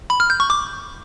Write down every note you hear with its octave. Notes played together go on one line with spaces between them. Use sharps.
B5
F6
G6
C#6
D6